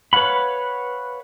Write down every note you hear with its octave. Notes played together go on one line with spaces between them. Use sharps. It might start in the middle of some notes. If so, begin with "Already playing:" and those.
B4 C#5 F5 F#5 B5